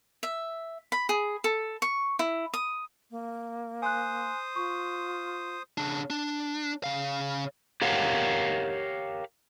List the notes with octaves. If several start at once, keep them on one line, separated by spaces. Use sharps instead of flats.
E5
B5
G#4
A4
C#6
E4
D#6
A#3
C5 G#5 C6 D#6 F#6
F4 C#6
C#3 D4
D4
C#3 F5
G4 A#4 C#5 F5 F#5